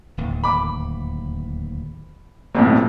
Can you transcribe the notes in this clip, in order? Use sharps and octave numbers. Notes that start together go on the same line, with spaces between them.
D1 D#2
B5 D6
B1 F2 A2 A#3 B3